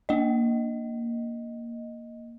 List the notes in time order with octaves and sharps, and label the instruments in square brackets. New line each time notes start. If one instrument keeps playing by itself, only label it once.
[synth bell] A#3 D#5